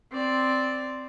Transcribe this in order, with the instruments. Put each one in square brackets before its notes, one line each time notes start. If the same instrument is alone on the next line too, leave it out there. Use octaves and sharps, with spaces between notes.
[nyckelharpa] C4 D5